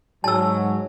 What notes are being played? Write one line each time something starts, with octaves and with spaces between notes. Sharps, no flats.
G#2 F#3 A5 E6